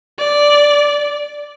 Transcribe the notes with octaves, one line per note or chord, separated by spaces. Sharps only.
D5